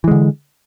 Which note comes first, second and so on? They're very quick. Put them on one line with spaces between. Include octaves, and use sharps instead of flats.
E3 G#3 D3